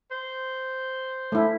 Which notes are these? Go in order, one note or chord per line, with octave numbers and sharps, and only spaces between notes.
C5
A3 E4